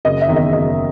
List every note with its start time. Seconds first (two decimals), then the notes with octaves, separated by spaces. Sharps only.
0.05 F#1 D#5
0.21 E5
0.28 E2 D#3
0.36 D#5
0.53 F#1 D#5